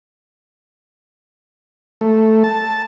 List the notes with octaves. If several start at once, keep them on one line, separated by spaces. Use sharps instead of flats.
A3
A5